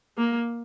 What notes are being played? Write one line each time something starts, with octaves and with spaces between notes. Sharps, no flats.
A#3